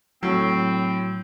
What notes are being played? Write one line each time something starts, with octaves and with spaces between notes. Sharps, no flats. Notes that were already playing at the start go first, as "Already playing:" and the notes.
A2 F#3 C4